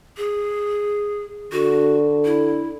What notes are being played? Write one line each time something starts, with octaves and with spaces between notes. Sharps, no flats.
G#4
D3 F#4
E4